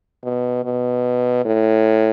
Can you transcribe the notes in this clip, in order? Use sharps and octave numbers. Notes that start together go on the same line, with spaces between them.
B2
B2
A2